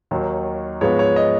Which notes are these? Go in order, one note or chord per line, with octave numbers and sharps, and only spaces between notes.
D#2 D#3 F#3
G#2 F3 G#3 B3 C#5
C#5
D#5